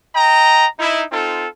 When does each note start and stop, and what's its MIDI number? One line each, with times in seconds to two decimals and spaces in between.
0.15 0.67 75
0.15 0.67 79
0.15 0.67 82
0.79 1.04 63
0.79 1.04 64
1.12 1.46 60
1.12 1.46 63
1.12 1.46 65
1.12 1.46 69